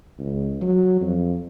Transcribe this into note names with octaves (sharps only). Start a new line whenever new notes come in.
C#2
F#3
F2